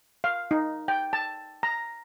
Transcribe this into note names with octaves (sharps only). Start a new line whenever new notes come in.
F5
D#4
G5
A5
A#5